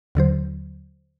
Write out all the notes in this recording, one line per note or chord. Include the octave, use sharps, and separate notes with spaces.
D#2 D3 F#3 C5